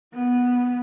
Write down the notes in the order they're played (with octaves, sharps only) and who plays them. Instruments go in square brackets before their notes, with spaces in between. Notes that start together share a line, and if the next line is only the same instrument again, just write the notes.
[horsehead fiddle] B3